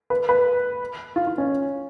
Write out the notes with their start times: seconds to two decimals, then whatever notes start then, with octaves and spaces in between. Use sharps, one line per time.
0.10 B4
0.29 B4
1.16 F4
1.27 F4
1.38 C#4